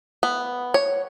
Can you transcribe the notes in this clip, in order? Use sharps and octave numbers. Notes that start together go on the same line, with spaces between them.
B3
C#5